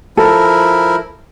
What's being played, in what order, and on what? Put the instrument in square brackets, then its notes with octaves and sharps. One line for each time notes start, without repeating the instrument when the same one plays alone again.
[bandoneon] F3 E4 A#4 [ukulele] A4